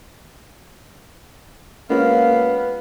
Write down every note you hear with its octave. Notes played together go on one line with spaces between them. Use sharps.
G#3 A#3 B3 C#4 F4 F5